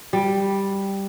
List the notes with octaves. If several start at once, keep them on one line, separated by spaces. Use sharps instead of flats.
G3